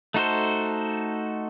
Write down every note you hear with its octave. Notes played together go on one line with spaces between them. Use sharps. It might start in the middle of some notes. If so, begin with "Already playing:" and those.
A3 D#4 F#4 A4 C5